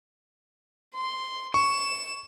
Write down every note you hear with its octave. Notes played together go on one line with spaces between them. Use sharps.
C6
C#6 E7